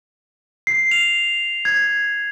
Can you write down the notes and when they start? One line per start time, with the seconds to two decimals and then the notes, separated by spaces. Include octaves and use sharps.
0.67 C7
0.91 F7
1.65 G#6